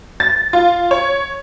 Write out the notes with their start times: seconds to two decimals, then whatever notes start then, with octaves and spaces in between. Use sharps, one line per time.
0.20 A6
0.53 F4
0.91 C#5